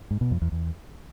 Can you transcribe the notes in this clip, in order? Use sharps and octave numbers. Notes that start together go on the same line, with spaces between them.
G#2
B2
F2
E2
E2